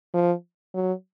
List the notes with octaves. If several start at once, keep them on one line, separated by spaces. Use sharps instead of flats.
F3
F#3